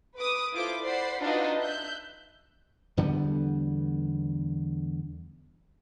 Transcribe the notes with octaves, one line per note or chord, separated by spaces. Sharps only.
B4 D6 D#6
E4 F4 A4 C5 D6
C5 D5 F#5 B5 C7
D4 D#4 F4 F#4 B4 D#5
E5 F#6 G6
E2 D3 G3 B3